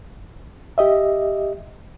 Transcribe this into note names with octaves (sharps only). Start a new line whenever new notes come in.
G4 D#5 E5